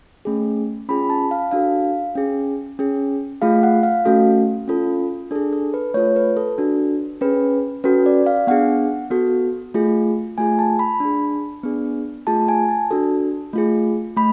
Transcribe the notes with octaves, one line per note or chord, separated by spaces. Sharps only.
A3 C#4 G#4
C#4 F4 G#4 B5
A5
F5
D4 F#4 A4 F5
C#4 G#4
C#4 G#4
A3 F4 G#4 F5
F#5
F5
A3 C#4 F#4 A4
C#4 F4 A4
D4 G#4 A4
A4
B4
A3 F4 A4 C#5
B4
A4
D4 F#4 A4
C#4 G#4 B4
C#4 F#4 A4 B4
D5
F5
B3 D4 G#4 F#5
B3 F#4 A4
A3 F4 G#4
A3 F4 G#4 G#5
A5
B5
D4 G#4
B3 D4 G#4
A3 F4 G#4 A5
G#5
A5
D4 F#4 A4
A3 F4 G#4
A3 B5